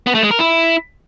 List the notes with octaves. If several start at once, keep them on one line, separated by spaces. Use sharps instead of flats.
B3
A3
G#3
A#4
E4